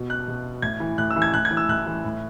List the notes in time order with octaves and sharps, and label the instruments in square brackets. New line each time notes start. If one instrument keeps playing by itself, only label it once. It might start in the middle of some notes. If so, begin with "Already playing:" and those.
Already playing: [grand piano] B2
F#6
B2
A2 G#6
E3
A2 F#6
E6
E3
G#6
A2 F#6
G#6
E3
E6
A2 F#6
E3
A2